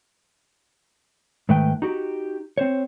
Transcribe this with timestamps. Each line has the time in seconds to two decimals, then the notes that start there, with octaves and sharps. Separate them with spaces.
1.49 G#2 D#3 A3 B4 G5
1.82 D#4 F#4 G4
2.58 C4 C5 C#5